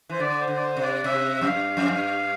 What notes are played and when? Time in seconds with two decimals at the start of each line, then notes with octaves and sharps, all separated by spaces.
0.09 E3 C5
0.20 D3 D5
0.41 C5
0.48 D3
0.56 D5
0.62 C5
0.76 C3
0.82 D5
1.04 C3 E5
1.36 E5
1.41 F2
1.47 G2 F5
1.77 F2
1.88 G2